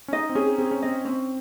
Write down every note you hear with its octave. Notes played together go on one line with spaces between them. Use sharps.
C#4
D#4 D#5
C4
C#4 G#4
C4 G#4
C#4
C4 D#5
C4 C#4